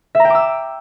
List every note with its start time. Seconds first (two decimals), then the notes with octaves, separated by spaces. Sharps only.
0.15 E5
0.20 A#5
0.25 G5
0.30 D6
0.35 E6